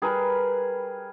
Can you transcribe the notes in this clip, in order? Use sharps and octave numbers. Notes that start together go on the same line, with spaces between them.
G3 G#4 A#4 B4